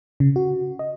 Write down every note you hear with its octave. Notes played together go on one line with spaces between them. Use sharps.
C#3
F#4
D#5